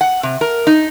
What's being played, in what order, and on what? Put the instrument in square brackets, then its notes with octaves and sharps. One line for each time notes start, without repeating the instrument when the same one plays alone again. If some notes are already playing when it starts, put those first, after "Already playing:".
[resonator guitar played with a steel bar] F#5
C3
A#4
D#4